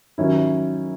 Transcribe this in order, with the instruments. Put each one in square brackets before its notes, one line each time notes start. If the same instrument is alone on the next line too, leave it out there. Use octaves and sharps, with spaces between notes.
[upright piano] D#3 [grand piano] F#3 C#4 E4